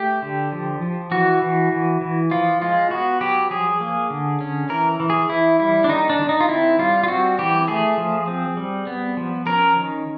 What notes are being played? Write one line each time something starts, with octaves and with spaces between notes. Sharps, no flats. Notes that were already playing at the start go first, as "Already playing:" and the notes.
Already playing: A3 G4
D3
F3
F3
E3 F#4
E3
E3
E3
F3 F4
G#3 F4
B3 F#4
F#3 G4
F3 G#4
A#3
D3
C#4
E3 A#4
E3
G#4
E3 E4
G3 E4
D4
D#3 D#4
D4
D#3
D#4
F4
C4 E4
G3 F4
F4
C4 F#4
E3 G4
A3 G#4
F3
C4
G3
B3
F3
C#4 A#4
D#3